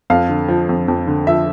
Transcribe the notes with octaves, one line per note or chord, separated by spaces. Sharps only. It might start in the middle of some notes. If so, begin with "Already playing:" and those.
F2 F5
D3
F3
F2
F2
D3
F3 E5